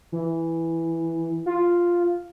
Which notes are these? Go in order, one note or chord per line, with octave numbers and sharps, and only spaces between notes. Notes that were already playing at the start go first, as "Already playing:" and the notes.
E3
F4